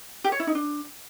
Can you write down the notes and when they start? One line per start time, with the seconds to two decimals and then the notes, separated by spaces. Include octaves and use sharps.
0.24 G4
0.32 C#5
0.40 E4
0.47 D#4
0.55 D4